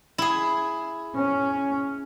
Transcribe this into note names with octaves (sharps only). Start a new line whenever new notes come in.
E4 G#4
C#4